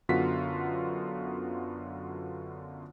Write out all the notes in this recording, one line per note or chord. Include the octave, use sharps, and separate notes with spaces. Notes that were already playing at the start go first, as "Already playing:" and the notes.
F#2 D3 B3 F4 F#4 B6